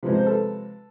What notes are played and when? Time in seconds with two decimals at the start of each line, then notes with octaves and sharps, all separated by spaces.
0.03 C3 F3 G#3 B4
0.14 C5
0.26 A4 B4